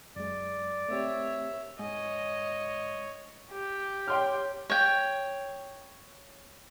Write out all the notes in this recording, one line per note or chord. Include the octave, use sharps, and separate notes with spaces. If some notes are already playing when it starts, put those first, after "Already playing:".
F#2 G#3 D5
A3 C4 G4 C#5 E5
G#2 C#5 D#5
G4
C#5 G5 C6 F6
C#5 G5